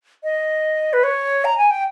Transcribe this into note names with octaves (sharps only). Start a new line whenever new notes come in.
D#5
B4
C#5
A#5
G#5
G5